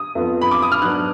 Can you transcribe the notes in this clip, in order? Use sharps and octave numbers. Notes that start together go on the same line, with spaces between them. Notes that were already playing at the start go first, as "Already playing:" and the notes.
Already playing: D#6
F2 F3 B3
B5
D6
D#6
F6
G#2 F#3 B3 D4 F#6